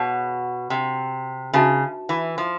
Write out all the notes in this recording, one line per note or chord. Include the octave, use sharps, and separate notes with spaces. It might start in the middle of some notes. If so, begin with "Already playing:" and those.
Already playing: B2 G#4 C#5 F5 A5
C3
C#3 D#4 F#4 B4 E5 A5
E3
F3